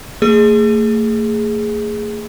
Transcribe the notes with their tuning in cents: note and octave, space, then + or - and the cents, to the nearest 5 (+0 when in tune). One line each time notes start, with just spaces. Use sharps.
A3 +40 G#4 +0